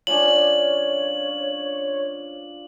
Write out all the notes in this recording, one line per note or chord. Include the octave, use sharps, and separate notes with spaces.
F3 C#4 D4 C#5 F#7